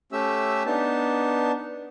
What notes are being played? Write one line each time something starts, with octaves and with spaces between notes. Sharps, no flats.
A3 C#4 G4 E5 E6
B3 D4 D#4 A5